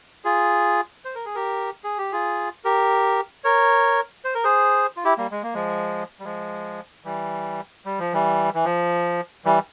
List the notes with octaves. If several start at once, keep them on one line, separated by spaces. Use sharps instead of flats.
F4 G#4
C5
A#4
G#4
G4 A#4
G#4
G4
F4 G#4
G4 A#4
A#4 C#5
C5
A#4
G#4 C5
F4
E4 G4
G3 A#3
G#3
A#3
F3 G#3
G3
F3 G#3
E3 G3
G3
F3
E3 G3
E3
F3
E3 G3